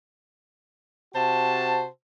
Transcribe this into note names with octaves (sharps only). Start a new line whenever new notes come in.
C3 F#4 C5 A5